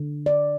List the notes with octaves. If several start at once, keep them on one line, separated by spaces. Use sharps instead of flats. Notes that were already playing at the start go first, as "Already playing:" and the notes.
Already playing: D3
D5